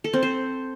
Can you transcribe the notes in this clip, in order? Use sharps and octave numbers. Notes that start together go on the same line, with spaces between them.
A4
C4
C5